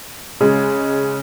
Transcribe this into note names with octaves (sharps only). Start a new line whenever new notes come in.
C#3 G#3